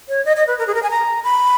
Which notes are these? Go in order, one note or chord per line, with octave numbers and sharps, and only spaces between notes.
C#5
D#5
D#5
B4
A#4
G#4
A#4
G#5
A#5
B5